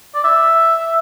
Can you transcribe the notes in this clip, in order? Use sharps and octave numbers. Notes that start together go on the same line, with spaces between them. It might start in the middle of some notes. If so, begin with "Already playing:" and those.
D5
E5